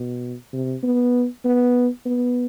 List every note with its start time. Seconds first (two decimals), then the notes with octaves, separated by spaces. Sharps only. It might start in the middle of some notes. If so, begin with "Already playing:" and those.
Already playing: B2
0.53 C3
0.83 B3
1.45 B3
2.06 B3